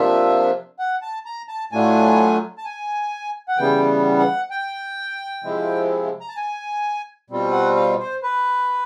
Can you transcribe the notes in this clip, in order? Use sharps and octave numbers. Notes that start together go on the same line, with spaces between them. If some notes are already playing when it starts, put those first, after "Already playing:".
Already playing: C3 F3 A#3 D4 F4 E5
F#5
A5
A#5
A5
A2 F#3 A3 D4 F4 G#5
A5
G#5
F#5
C#3 E3 G3 B3 G5
F#5
G5
C3 F3 G#3 C4 E4
A#5
A5
G#5
B2 G3 C4 F4
F#5
F5
C5
B4